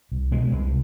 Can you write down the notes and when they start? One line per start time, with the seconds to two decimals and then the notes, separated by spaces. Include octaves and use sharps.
0.12 C2
0.31 B2 G#3
0.51 C2